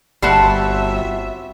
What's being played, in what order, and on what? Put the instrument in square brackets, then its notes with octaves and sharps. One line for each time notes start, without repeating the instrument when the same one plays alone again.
[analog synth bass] G1 [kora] G3 C4 [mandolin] F#4 A5 C6 [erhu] E5